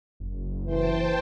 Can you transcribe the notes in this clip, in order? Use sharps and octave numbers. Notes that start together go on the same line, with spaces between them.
F#1
E3 C5 G5 A5